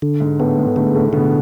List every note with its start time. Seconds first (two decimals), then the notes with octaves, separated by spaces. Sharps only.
0.02 D3
0.20 G#2 G#3
0.39 A2 A3 B3
0.58 G#2 G#3
0.76 A2 D3 A3
0.94 A2 A3
1.13 B2 D3 B3